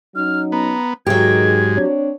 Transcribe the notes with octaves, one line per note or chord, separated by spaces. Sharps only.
F#3 C#4 D#4 F6
B3 A#5
G#2 D#3 F#3 G#3 G4 G#4 G#6
C4 D4 C#5